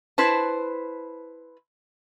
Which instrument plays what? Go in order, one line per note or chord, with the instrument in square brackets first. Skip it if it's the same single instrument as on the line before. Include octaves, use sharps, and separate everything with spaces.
[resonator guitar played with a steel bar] E4 B4 C5 A5